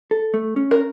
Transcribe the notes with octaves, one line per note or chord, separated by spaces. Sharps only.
A4
A3
C#4
A#4